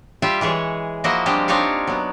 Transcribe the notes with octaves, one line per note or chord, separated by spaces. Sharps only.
G3 F4 G4 E5
E3 G#3 G#4 C#5
F3 A#3 E4 F#4 D#5
F3 G3 G#3 C4 D4 G4
C4 D4 D#4 F4 C#5 F5
F#3 B3